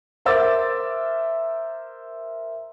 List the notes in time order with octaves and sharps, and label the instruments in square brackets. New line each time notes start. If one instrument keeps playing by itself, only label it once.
[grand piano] A#4 C5 E5 D6 E6 A6